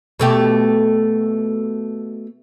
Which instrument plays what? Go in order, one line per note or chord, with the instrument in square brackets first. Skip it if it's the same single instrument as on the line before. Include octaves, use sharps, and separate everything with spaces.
[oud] B2 A3 G4